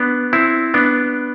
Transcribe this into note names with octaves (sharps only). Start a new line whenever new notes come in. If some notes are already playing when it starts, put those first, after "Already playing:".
Already playing: B3 D4
C4 E4
B3 D4